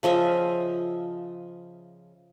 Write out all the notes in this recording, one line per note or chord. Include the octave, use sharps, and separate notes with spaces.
C#3 F3 D#5 E5